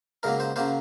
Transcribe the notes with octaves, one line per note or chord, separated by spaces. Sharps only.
C#2 C#3 F#3 A#3 A#4
C5
C#3 F#3 A#3 C5